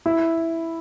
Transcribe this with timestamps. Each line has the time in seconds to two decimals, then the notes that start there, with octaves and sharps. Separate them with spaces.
0.06 E4